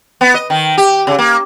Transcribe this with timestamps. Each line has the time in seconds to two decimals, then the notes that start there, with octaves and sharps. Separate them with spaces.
0.21 B3
0.34 D#5
0.50 D#3
0.78 G4
1.07 C#3
1.19 A#3